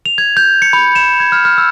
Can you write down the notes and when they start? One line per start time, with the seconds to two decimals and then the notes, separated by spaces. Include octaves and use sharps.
0.06 F7
0.18 G#6
0.37 G6
0.62 C#7
0.73 B5
0.96 E7
1.20 G#6
1.32 F6
1.45 F6
1.58 E6